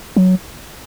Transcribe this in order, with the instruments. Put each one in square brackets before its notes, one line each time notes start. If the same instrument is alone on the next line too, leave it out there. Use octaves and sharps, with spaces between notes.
[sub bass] F#3